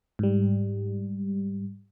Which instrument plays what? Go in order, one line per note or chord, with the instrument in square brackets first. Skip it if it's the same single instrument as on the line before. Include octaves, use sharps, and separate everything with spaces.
[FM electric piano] G#2 G3